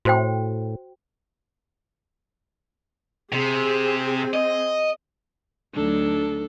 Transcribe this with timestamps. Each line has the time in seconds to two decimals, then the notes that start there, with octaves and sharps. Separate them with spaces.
0.05 A2 F#4 C5 G5
3.32 C3 C4 G#4
4.34 D#5
5.74 D2 F#3 D4 D#4 A4